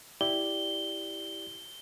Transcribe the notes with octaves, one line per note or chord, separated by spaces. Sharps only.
E4 G4 D5 G7